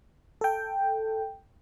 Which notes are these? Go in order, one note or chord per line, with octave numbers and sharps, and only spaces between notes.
A4 G5